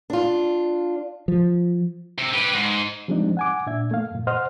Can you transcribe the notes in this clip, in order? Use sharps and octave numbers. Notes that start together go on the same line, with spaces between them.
D4 F4
F3
C3
G4 B4
G#2
F3 G3 G#3 C4 D4 D#4
F#5 G#5 D6
A#2 D4 E5 G#6
A3 A#3 F5
F#2 A#2
C5 D#5 F#5 C6 F6